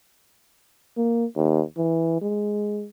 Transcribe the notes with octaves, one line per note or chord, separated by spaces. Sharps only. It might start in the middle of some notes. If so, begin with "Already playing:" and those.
A#3
D#2
E3
G#3